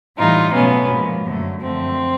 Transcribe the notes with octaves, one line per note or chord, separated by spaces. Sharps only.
A2 E3 G3 D#4 F4
B2 F#3 A3 B3 C#4
A#2 F3 G#3
F#2 D3 F#3 A3
F#2 D3 F3 A3 C4